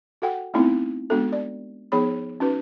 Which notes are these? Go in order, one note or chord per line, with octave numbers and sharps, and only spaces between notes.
F#4 A4 F#5 G5
A3 B3 C4 D#4 E4
G#3 B3 D4 F#4 A4
D5
F3 B3 D#4 G#4 C#5 B5
C#4 D#4 F#4 B4